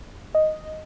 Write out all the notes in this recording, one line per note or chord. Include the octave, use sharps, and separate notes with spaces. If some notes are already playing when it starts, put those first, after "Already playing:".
D#5